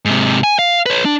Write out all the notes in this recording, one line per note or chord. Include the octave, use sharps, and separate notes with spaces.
G#2 C3
G#5
F5
B4 C#5
D4